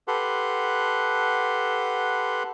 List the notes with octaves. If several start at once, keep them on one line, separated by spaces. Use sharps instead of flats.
G4 A4 B4 F#5 C6